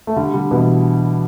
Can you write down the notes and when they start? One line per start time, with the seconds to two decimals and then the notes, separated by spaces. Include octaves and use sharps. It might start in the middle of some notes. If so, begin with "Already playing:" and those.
0.07 A3
0.16 D3 G3
0.34 D3 G3
0.51 B2 E3